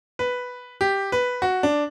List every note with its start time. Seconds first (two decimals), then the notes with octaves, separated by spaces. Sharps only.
0.19 B4
0.81 G4
1.12 B4
1.42 F#4
1.63 D4